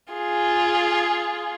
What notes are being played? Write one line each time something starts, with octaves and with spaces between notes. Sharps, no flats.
F4 G#4